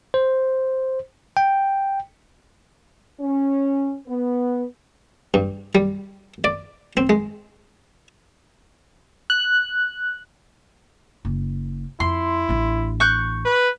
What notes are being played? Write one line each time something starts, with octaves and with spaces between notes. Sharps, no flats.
C5
G5
C#4
B3
G2
G3
D5
C4
G#3
F#6
F#1
F2 E4 C6
A1 D4
C#6 F#6 G6
B4